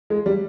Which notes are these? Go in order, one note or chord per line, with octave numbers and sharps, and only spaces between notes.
G#3
G3